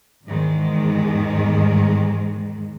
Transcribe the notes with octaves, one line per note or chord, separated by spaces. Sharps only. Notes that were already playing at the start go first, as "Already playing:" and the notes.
E2 G#2 D#3 G#3